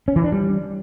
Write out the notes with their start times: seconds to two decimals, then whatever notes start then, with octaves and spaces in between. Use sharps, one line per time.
0.08 C#4
0.16 E3
0.24 D4
0.32 G3